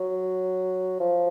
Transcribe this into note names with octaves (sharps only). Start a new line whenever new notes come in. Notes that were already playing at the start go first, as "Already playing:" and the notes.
Already playing: F#3
F3